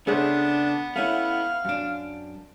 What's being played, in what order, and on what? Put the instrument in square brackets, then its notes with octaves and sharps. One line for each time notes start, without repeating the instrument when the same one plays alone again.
[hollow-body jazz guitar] C#3 A3 [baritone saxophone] B3 [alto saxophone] D4 [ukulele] G#4 C5
[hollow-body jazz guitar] A3 C#4 E4 [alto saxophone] F5
[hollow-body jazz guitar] F#2 D4